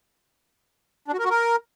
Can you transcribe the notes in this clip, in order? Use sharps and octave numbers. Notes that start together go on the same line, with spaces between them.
D4
F#4
A#4
F#4
A#4